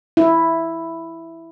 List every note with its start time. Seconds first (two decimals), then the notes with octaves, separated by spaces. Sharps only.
0.17 E4